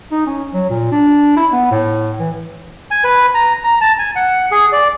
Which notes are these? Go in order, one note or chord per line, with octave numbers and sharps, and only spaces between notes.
D#4
C#4
F#3
A#2
D4
E4
B3
A2
E3
G#5
B4
A#5
A#5
A5
G#5
F#5
G#4
D5